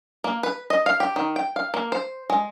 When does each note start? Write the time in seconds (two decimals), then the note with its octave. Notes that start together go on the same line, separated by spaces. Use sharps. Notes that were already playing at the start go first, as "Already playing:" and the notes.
0.24 A#3
0.43 B4
0.70 D#5
0.86 F5
1.00 G4
1.16 D#3
1.36 G5
1.56 F5
1.74 A#3
1.92 C5
2.30 G#3